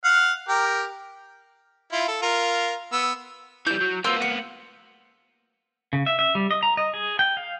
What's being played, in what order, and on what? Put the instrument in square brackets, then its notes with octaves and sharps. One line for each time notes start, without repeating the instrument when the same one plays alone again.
[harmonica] F5 F#5
G4 A#4
E4 F4
A4
F4 A#4
B3 E6
[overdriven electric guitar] E3 G3 [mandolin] G6
[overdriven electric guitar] F#3
[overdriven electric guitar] A#3 B3 [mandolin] F4 C5 E6
[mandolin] F#5
[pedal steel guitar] C#3
E5
E5
G3
D#5
A#5
D#5
G#4
G5
F5